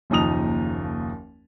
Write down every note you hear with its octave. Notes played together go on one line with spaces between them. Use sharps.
F#1 D#2 F3 D#4 D#6 F7